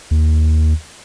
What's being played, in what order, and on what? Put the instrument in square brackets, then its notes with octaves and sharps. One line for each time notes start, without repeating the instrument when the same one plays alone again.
[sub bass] D#2